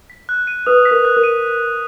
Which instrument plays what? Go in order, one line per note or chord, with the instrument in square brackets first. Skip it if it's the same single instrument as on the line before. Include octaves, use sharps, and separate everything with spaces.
[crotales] B6
F#6
D#7
[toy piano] B4 [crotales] D#6
[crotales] B6
[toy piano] A#4
[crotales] F#6
[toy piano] A#4
[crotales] D#7